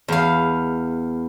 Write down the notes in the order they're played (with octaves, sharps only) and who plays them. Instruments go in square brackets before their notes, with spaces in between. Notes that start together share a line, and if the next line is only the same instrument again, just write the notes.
[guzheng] E2 F5